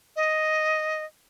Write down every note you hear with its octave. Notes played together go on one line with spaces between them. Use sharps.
D#5